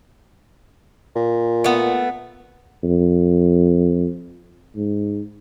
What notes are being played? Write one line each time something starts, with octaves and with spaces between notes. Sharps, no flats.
A#2
A3 B3
F2
G#2